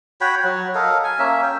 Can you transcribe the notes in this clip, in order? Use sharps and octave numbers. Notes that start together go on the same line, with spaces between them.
F#4 C#5 G5 B5
F#3
A4 A#4 D#5 F5
G#5
A#3 C#4 E5
G5